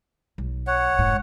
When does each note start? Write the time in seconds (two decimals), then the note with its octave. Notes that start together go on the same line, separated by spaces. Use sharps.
0.38 B1
0.67 C#5 F#5
0.99 F1 G#2